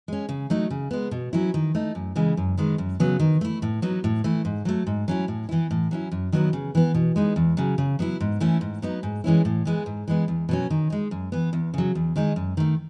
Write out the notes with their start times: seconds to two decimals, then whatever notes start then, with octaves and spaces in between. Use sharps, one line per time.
0.08 G#3 C#4
0.29 C#3
0.50 F#3 A3 D#4
0.70 C#3
0.91 G#3 B3
1.11 B2
1.33 F#3 C#4 E4
1.54 D#3
1.75 A3 D#4
1.95 F#2
2.16 C#3 E3 G#3
2.37 F#2
2.57 D#3 G#3 B3
2.78 F#2
3.00 C#3 F#3 B3
3.20 D#3
3.41 A3 E4
3.62 A2
3.82 F#3 B3 D#4
4.04 A2
4.24 E3 A3 E4
4.45 G#2
4.65 F#3 A3
4.87 G#2
5.08 F#3 C#4 E4
5.28 A2
5.49 E3 B3 E4
5.71 A2
5.91 F#3 C#4 E4
6.12 F#2
6.33 D#3 F#3 B3 E4
6.53 C#3
6.75 E3 B3
6.94 B2
7.16 G#3 B3 D#4
7.36 E2
7.57 C#3 F#3
7.78 C#3
7.99 F#3 B3 E4
8.21 G#2
8.40 E3 A3 C#4 E4
8.61 G#2
8.82 F#3 B3 D#4
9.03 G#2
9.24 E3 G#3 C#4 E4
9.45 A2
9.65 E3 G#3 B3
9.86 G#2
10.08 E3 G#3 B3
10.28 E2
10.49 B2 F#3 C#4
10.70 D#3
10.90 G#3 D#4
11.11 F#2
11.32 E3 B3
11.53 E2
11.74 C#3 F#3
11.95 E2
12.16 D#3 G#3 D#4
12.36 F#2
12.57 D#3 A3